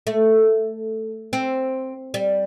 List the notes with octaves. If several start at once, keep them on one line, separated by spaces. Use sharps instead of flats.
A3
C4
G3